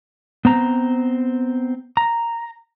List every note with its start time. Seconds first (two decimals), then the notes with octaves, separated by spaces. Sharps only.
0.45 B3 C4 A#5
1.97 A#5